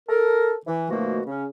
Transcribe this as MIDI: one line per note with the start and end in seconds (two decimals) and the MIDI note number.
0.09 0.55 69
0.09 0.55 70
0.66 0.88 52
0.90 1.21 47
0.90 1.21 51
0.90 1.21 53
0.90 1.21 57
0.90 1.21 58
0.90 1.21 66
1.27 1.45 49
1.27 1.45 61